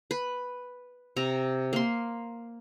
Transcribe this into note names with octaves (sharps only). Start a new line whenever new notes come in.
B4
C3 A#5
A#3 C6